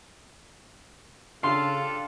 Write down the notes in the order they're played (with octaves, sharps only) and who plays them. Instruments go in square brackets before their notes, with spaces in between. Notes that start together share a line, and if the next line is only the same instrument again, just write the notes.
[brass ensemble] C#3 [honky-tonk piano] D4 G4 F5 [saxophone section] F4 A4 [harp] C6